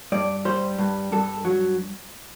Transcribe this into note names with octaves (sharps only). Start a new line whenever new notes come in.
G2 D5
G3 C5
G2
G2 A4
F#3